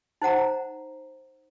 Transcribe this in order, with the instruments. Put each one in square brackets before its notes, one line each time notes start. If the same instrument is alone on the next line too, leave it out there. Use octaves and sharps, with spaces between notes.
[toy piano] D#4 C5 F#5 A#5